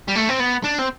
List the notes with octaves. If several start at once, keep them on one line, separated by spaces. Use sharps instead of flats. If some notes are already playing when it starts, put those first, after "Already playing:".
G3
A3
C4
B3
D4
C4